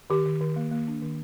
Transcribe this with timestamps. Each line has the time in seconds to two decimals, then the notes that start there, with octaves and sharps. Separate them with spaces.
0.10 D#3 G4
0.26 D#3
0.40 D#3
0.56 A#3
0.71 A#3
0.88 D4
1.02 D#3